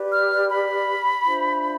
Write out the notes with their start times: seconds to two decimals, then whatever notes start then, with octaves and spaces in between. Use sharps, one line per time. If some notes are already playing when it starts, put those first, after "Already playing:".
Already playing: G4 B4 D5
0.12 F6
0.50 B5
1.25 D4 F4 C5 E5